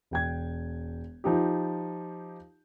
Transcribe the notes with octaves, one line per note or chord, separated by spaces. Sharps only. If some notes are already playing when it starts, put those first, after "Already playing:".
E1 G5 G#6
F3 D#4 G4